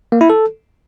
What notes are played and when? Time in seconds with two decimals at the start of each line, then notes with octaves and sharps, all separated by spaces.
0.12 A#3
0.21 E4
0.30 A4